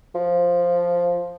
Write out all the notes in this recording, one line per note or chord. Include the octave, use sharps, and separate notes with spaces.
F3